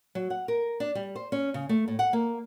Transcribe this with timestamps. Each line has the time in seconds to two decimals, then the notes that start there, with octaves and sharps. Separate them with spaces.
0.15 F#3
0.30 F#5
0.48 A#4
0.80 D4
0.95 G3
1.15 C5
1.32 C#4
1.54 C#3
1.69 A3
1.88 A2
1.99 F#5
2.13 A#3